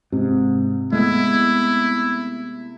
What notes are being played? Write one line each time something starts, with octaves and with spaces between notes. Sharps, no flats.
G#2 C3
G#3 A3 B3 E4